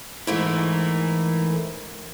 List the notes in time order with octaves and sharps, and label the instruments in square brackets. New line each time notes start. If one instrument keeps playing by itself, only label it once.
[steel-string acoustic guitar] G#2 A3 A#4 [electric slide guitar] E3 E4